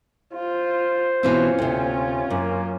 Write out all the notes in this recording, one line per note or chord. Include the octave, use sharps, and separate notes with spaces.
F4 C5
B2 E3 C4 C#4 F4
D2 C3
F#2 A#3